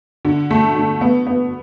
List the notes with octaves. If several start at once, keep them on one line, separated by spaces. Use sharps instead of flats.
D3
A3
D3
B3
B3